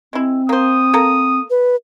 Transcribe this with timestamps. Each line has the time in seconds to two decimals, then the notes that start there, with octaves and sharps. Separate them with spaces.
0.13 G#3 C4 E4
0.49 A#3 C5 D#6
0.93 A#3 A4 A#5
1.50 B4